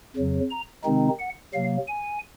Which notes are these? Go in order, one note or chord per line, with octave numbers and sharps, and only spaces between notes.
F2 C#3 F#3
A#5
C3 D#3 G#3 C4 D#4
F#5
C3 F#3 A#3 F5
G#5